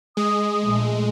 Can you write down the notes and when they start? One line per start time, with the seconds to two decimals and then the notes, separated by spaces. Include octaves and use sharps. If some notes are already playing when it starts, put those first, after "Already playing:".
0.17 G#3 D#6
0.63 A#1 A3